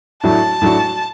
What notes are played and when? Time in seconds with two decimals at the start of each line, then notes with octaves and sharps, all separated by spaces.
0.24 A2 F#3 D4 F#4 A5
0.62 A2 F#3 D4 F#4